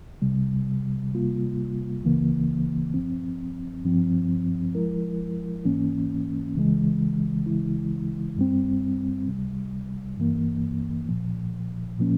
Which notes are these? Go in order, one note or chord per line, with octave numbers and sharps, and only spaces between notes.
C2 C3 G3
C3 G3 A#3 F4
C#2 C#3 E3 A#3
G2 F3 C4
G2 F3 C4
F3 G#3 E4 A#4
G#2 E3 A#3 C#4
C#2 C#3 E3 G#3
C#2 C#3 E3 G#3 E4
G2 G3 C4
C#2 C3 G3
G2 E3 A#3
C2 A#2 F3
A#2 F3 A#3 C#4